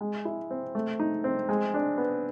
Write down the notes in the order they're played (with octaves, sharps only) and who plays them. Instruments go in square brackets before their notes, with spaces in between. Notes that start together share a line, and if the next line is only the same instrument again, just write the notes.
[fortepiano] G#3
E4
C4
A3
D#4
C4
G#3
D4
B3